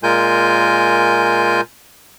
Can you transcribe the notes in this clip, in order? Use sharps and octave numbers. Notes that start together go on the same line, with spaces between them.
A#2 G#3 F4 A#4 G#5 G6